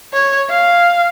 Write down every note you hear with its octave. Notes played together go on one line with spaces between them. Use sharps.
C#5
F5